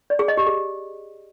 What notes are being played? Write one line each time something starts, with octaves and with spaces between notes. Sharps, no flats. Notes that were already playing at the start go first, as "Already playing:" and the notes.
D5
G#4
D#5
G4
G#4